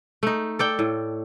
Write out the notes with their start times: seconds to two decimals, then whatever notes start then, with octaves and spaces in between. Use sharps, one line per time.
0.23 A3 D#4
0.59 A4 D5 G5
0.79 A2